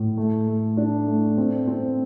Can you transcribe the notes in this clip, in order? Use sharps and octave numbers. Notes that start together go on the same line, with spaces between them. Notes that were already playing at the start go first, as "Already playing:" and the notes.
Already playing: A2
A3
A3
D4
A3
C4
C4